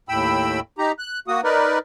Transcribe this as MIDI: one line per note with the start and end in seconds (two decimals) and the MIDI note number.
0.09 0.60 39
0.09 0.60 45
0.09 0.60 79
0.09 0.60 83
0.09 0.60 88
0.78 0.92 63
0.78 0.92 67
0.78 0.92 82
0.99 1.20 90
1.28 1.41 58
1.28 1.41 66
1.28 1.41 87
1.44 1.79 63
1.44 1.79 70
1.44 1.79 71
1.44 1.79 74